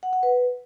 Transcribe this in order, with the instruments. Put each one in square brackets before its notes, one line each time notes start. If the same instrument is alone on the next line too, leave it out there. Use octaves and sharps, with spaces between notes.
[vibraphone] F#5
F#5
B4